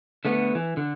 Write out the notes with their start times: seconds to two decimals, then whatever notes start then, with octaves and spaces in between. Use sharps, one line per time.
0.25 D3 A3 B3
0.55 E3
0.77 D3